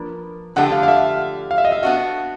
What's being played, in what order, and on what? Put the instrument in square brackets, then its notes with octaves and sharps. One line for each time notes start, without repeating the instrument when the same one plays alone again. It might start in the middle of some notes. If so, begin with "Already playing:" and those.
Already playing: [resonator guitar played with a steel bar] F3 A#3 D4 B4
[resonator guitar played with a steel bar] D3 F3 A3 D4 G4 [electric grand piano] F#5
[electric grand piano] F5
F5
E5
F5
E5
D#5
E5
[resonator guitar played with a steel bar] B3 D4 F#4